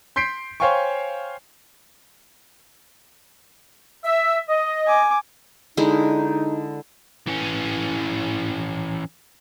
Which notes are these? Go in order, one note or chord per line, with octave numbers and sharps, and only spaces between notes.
C6 G6 B6 C7 D7
C5 C#5 F5 G5 G#5 C#6
E5
D#5
G#5 D6
D3 G#3 D#4 E4
E3 C#4